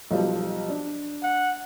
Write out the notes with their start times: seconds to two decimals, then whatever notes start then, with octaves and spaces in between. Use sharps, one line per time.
0.11 B1 F3 G3
0.68 D4
1.23 F#5